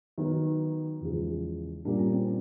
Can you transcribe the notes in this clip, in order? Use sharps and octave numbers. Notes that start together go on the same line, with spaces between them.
D#3 F#3 B3
E2 C#3 F3 G#3
A#2 G3 A#3 D4
C#4
C4